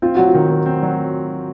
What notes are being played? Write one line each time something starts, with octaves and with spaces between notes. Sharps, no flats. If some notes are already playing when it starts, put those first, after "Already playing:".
C4 F4
F#3 F#4
F4
D#3
D#3
C4
F#3